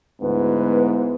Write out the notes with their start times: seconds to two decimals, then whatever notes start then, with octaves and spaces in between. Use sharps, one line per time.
0.21 D2 G#2 B3 E4 B4